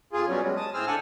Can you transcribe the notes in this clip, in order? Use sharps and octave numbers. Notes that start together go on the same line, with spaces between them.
F2 F4 G#4
B2 F#3 G3 C#4
G3 G#3
A5 D#6
A2 C4 G#4 C5 E6 F6
D3 D4 F#5 G#5 A5